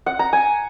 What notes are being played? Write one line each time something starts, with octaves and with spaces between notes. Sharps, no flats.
F#5
A#5
G#5